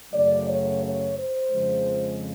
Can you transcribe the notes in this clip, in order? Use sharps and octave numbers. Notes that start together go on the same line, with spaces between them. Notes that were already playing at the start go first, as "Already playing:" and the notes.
F#2 C#3 F#3 A3 D5
C#5
C#5
C5
F2 C#3 F3 G#3